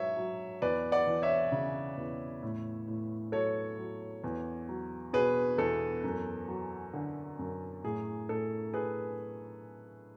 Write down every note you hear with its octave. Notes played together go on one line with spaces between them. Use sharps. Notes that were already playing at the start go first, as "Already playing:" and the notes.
Already playing: G#2 F#3 C#5 E5
F#3
E2 B4 D5
D5 F#5
E3
C#5 E5
C#3
E2
A2
A2
F#3 A4 C#5
F#3
E2
F#3
B2 G#4 B4
E2 A4
F#2
F#3
D3
F#2
A2 G#4
A2 A4
G#4 B4